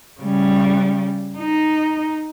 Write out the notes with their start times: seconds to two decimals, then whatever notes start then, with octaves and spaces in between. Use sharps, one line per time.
0.21 C#3 G3
1.38 D#4